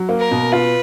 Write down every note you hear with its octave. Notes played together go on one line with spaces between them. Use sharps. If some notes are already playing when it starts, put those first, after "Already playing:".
Already playing: F#3
A#3
A#4
B2
F4 B4